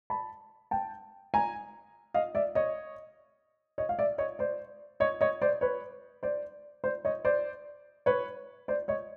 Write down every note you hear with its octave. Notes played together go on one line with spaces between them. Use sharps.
A5 B5
G5 A5
G#5 A#5
D#5 F5
D5 E5
C#5 D#5
C#5 D#5
F5
D5 E5
C#5 D#5
C5 D5
C#5 D#5
C#5 D#5
C5 D5
B4 C#5
C5 D5
C5 D5
C#5 D#5
C5 D5
B4 C#5
C5 D5
C#5 D#5